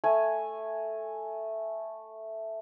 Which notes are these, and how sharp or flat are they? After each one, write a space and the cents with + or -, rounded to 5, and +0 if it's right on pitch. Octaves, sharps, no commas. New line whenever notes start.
A3 +0 G#5 +0